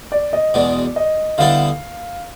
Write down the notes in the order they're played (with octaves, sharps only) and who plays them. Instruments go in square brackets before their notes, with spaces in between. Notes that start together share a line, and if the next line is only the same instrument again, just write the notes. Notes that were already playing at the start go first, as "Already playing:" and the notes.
[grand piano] D5
D#5
[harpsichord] E2 B2 G#3 [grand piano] D5
[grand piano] D#5
[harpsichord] D3 G3 B3 E4 A4 [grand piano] F5